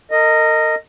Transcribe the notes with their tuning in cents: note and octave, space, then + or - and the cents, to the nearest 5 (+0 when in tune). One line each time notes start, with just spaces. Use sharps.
A#4 -40 D#5 +0